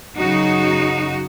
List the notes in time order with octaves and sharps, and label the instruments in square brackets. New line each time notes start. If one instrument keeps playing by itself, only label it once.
[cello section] F#2 C#3 D#4 F#4